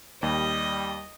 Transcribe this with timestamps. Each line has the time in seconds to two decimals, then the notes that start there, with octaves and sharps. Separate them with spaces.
0.23 D#2 G3 D#5